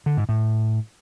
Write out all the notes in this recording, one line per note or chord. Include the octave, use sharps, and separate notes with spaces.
D3
G#2
A2